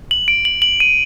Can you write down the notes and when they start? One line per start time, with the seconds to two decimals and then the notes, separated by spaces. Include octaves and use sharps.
0.11 F#7
0.28 D7
0.45 F#7
0.62 F#7
0.80 D#7